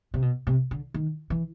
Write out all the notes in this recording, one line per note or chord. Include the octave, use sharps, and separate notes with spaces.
C3
B2
C3
D3
D#3
E3